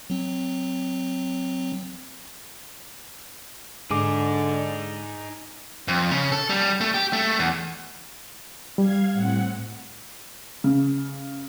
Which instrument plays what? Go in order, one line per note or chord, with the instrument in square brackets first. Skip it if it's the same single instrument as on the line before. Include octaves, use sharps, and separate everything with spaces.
[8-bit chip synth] F#3 C4
[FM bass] G#2 [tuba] D3 [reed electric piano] G#3 D6 [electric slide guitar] D#4 G#4
[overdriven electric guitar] F2
C#3
A4
G3
A3
G4
A3
E2
[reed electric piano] G3 [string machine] F5 G#6
[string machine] A2 C4 F#5
[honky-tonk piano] C#3